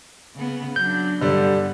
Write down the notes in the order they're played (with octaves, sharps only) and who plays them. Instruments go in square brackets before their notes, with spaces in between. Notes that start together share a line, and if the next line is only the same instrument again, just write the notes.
[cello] C#3 B3
[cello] F#3 D4 [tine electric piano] G6
[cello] G2 B3 [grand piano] D3 G3